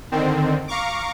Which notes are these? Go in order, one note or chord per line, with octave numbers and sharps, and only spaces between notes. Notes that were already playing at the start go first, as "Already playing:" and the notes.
D3 D#3 C4
F5 A#5 C#6 D6